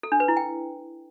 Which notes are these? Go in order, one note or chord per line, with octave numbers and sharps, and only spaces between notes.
A4
D4
B4
E4
G5